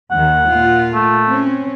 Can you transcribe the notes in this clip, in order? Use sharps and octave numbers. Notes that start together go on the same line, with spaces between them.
D#2 D#3 F#5
A#2 F4
A3
C4 C#4